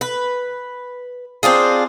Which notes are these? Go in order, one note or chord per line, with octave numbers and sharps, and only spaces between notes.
B4
C4 D4 F4 G#4